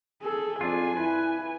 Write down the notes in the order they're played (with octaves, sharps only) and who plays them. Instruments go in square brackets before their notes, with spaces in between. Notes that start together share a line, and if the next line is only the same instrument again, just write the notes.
[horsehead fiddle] G#4 A4
[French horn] F2 [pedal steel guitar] D4 F4 [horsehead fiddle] G#5
[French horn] E4 [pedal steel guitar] B4